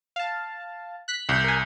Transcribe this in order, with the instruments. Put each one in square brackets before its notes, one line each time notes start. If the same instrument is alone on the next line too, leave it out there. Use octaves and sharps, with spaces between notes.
[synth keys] F5 A5
F#6 B6
[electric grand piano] C2 G6
[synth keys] A#4 G#5